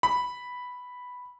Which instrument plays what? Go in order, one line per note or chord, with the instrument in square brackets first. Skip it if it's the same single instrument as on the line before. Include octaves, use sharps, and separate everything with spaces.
[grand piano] B5